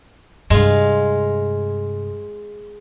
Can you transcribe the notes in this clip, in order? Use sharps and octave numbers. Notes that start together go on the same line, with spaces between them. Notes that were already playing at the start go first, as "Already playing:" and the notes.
G2 C3 G#3 F4